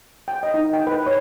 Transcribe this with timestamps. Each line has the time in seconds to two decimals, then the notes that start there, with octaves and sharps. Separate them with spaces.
0.28 G5
0.43 D#5
0.54 D#4
0.73 G5
0.87 B4
1.06 C#5